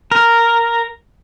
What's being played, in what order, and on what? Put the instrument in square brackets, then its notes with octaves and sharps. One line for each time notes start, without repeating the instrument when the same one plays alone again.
[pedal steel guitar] A#4